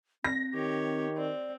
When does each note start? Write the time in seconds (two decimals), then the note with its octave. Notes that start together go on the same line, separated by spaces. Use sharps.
0.24 C4 A#6
0.54 D#3 G4 C#5
1.17 C4 D5